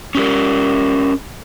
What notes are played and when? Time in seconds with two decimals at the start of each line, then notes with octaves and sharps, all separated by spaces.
0.15 C#4 G4 A#4